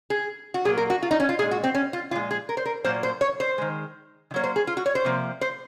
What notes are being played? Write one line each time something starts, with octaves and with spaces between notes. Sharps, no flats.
G#4
F#4
A#2 F#3 A#3 G#4
A#4
F#4
F4
D#4
C#4
F4
A#2 G#3 G#4
F#4
C4
C#4
F4
A#2 F3 G#3 F4
G#4
A#4
C5
A#4
A#2 F#3 A#3 C5
C5
C#5
C5
D#3 G#3
D#3
F#3 A#3 C#5
C5
G#4
F4
F#4
C#5
C5
C3 F3 A#3
C5